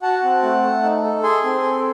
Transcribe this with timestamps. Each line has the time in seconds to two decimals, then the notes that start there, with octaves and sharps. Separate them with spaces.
0.02 F#4 F#5 A5
0.23 C4
0.42 A3
0.63 A3
0.83 D#4
1.03 A4
1.23 G#4 G#5 C6
1.44 C4
1.63 A4